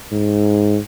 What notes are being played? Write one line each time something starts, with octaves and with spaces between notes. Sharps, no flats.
G#2